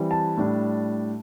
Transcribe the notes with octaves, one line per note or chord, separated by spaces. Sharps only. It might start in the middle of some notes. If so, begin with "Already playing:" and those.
Already playing: E3 G3 C4
A5
A2 G3 D4